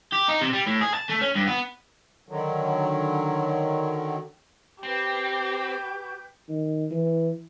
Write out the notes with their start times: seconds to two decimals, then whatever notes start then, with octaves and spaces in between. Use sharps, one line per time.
0.12 G4
0.28 D#4
0.41 C3
0.53 G3
0.66 A2
0.81 G#4
0.94 A5
1.09 A3
1.21 C#4
1.35 G2
1.47 B3
2.29 D3 D#3 F#3
4.83 C4 G4 B4 G5 G6
6.49 D#3
6.91 E3